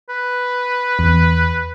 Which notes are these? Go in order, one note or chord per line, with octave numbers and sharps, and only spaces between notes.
B4
E2